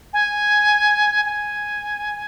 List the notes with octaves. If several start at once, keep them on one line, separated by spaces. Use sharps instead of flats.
G#5
G#5